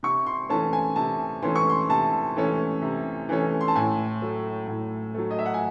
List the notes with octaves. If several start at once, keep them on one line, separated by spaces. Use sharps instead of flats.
C3 C#6
C6
E3 A3 C#4 A5
G#5
C3 A5
E3 A3 C#4 C6
C#6
C6
C3 A5
E3 A3 C#4
C3
E3 A3 C#4
C6
A5
A2 G#5
F#3 A3
A2
F#3 A3
D#5
E5
F#5
G#5